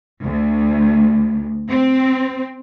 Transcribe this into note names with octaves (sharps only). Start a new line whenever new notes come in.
D2
C4